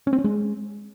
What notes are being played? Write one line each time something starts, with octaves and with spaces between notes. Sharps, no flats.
C#4
C4
C#4
G#3